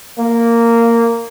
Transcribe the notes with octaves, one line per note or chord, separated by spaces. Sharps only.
A#3